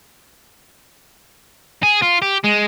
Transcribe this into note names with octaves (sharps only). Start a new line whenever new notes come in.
G#4
F4
G4
G#3